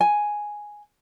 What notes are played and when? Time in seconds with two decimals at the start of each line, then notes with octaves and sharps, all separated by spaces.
0.01 G#5